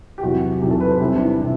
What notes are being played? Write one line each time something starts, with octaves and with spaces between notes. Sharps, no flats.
G4
E2 C3 F#3 F#4
E2 C3 F#3 G4
A4
B4
C5
C2 C3 E3 G4
D4
E4
C3 E3